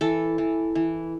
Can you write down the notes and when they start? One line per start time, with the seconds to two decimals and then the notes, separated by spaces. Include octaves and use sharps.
0.01 E3 A4
0.38 E3
0.75 E3